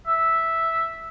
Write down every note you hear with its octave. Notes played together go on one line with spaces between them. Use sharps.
E5